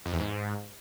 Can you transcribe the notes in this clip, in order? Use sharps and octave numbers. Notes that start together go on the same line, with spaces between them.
F2
E2
G#2